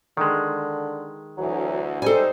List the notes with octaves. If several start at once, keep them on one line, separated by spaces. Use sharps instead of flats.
D3 D#3 G#3
D2 E3 F#3
G3 D#4 A4 C5 G#5